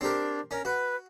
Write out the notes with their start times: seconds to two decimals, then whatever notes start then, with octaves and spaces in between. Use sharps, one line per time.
0.01 C4 D4 G4 A#4
0.51 C#4 A#4
0.65 F#4 B4